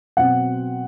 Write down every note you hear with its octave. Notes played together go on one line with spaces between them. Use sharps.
B2 F#3 C4 F#5